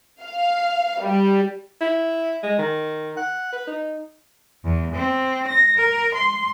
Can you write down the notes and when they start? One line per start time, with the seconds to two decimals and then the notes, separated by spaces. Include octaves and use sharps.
0.21 F5
1.01 G3
1.81 E4
2.43 G#3
2.58 D#3
3.17 F#5
3.52 B4
3.67 D#4
4.65 E2
4.95 C4
5.48 A#6
5.80 A#4
6.15 C6